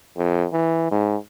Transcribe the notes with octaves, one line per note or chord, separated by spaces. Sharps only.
F2
E3
G#2